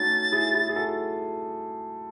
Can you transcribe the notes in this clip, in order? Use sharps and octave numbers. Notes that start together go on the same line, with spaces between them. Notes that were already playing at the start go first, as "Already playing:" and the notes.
Already playing: A3 C#4 D#4 F#4 A6
E4 G#4
E4 G#4
G#4
F#4 A4